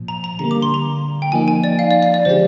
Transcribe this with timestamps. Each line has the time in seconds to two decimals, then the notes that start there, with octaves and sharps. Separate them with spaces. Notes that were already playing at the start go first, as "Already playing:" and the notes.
Already playing: A#2 F3
0.08 A#5
0.24 A#5
0.39 D3 G3 A#3 A#5
0.51 D6
0.62 C6
0.74 A#5
1.22 G5
1.32 F3 A#3 D#4 G#5
1.48 G#5
1.64 D5
1.79 F5
1.91 D5
2.03 D5
2.14 D5
2.25 D3 F3 G#3 D4 G4 C5